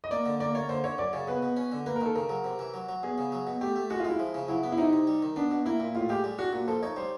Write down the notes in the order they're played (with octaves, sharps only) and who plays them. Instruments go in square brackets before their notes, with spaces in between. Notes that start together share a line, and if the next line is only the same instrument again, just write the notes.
[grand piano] D#5
[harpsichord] A#3 [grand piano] D5
[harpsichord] D3
[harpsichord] A#3 [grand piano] D5
[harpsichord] A#3 [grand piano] C#5
[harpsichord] D3 [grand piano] C5
[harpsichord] D3 [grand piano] C#5
[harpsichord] F#2 [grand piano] D5
[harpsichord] C#3 [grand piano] C#5
[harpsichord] B2 [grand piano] B4
[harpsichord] B2
C#4
D3
[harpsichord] A#3 [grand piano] B4
[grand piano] A#4
[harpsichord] D#3 [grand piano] A4
[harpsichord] C#3 [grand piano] A#4
[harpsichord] F#3
C3
E3
F#3
F#3
[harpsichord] E2 [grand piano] G#4
[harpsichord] C#3
F#3
B2
[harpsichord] A3 [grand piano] G4
[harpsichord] A3
[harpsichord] G#3 [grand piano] F#4
[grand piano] F4
[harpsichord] G#3
[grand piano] E4
[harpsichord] F3
C#3
[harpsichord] F#3 [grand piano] E4
[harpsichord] B3
[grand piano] E4
[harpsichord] C3 [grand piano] D#4
[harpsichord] C3
G3
D#3
[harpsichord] B3 [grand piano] D4
[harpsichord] B2
[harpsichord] A#3 [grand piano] E4
[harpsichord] A#2
[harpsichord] A2 [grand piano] F4
[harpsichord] G#3 [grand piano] G4
[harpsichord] G3
[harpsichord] D4 [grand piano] F#4
[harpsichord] A#2
[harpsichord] F3 [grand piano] A4
[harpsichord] D#4 [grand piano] C#5
[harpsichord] G3 [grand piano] C5